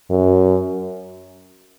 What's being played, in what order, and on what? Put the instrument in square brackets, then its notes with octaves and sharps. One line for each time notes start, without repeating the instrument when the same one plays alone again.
[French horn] F#2